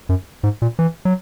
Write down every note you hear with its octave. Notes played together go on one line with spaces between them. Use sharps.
F#2
G#2
A#2
E3
F#3